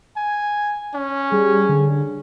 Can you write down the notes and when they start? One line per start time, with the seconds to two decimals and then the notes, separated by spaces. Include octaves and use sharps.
0.16 G#5
0.95 C#4
1.32 G3 G#4
1.69 D3